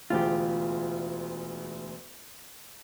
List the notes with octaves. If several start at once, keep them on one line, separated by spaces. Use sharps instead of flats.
E1 D2 F4 G4 G#4